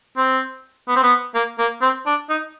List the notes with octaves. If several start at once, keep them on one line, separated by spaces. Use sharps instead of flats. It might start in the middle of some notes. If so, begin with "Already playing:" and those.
C4
B3
C4
B3
A#3
A#3
C4
D4
D#4